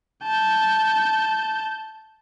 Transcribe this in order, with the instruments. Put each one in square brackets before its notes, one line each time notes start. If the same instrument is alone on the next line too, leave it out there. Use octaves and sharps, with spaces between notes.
[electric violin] A5 G6